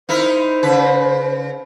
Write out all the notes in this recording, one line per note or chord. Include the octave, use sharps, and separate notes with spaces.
D#4 E4 A#4 C5
C#3 B4